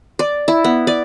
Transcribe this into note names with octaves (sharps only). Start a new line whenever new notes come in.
D5
E4
B3
D5